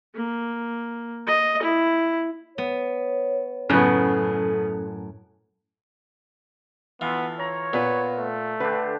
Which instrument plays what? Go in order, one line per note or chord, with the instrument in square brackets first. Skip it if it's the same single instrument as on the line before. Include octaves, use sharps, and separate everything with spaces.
[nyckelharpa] A#3
D#5
E4
[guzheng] B3 [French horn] C#5
[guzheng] F#2 A2 [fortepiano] C#3 B3 [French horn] A4
[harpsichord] E3 [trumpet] B3 [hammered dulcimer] F4 A4
[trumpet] C#5 [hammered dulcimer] A#5
[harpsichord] A#2 [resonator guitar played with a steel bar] B3 B4
[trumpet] A3
[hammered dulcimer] D3 D4 G4 [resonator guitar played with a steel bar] B4